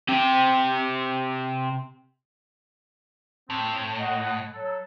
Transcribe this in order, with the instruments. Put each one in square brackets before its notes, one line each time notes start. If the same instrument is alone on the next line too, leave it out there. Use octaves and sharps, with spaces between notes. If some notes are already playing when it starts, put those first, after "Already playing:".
[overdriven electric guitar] C3 G4
[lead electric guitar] A2 [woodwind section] C4
[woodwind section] D#5 F#5
F#3 A4